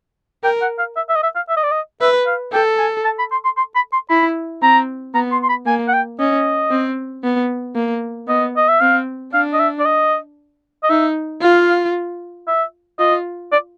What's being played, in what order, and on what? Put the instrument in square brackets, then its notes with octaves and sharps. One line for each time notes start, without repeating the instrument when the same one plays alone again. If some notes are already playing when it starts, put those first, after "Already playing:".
[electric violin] A#4 [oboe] G5
[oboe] F#5
F5
E5
E5
D#5
E5
F5
E5
D#5
D5
D#5
[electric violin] B4 [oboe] E5
[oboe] F5
[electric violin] A4 [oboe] G5
[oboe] G#5
A5
B5
C6
C6
C6
B5
C6
[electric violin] E4 [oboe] B5
[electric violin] C4 [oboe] A#5
[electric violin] B3 [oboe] A#5
[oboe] C6
C6
B5
[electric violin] A#3 [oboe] G#5
[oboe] F#5
G5
[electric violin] C#4 [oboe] D#5
[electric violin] C4
B3
A#3
[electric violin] B3 [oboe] D#5
[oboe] D#5
E5
[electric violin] C4 [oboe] F5
[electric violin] D4 [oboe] F5
[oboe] D#5
E5
D5
D#5
D#5
[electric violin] D#4 [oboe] E5
[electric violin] F4 [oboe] F5
[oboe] E5
[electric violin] F4 [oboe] D#5
[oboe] D5